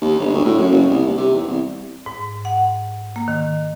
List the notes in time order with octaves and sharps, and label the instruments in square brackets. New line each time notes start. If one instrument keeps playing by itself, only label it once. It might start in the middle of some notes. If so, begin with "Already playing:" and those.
[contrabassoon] D#2
G1
D2
A2
F#2
F#1
C2
D#2
C3
E2
C2
[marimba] G#2
F#5
A#3
D#3